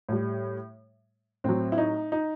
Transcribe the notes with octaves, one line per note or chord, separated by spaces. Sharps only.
A2 G3
A2 F#3 C4
E4
D#4
D#4